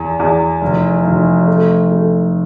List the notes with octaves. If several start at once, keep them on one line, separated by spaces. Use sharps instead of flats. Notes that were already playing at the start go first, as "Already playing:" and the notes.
Already playing: E2
E2
F1
F1
A3
A3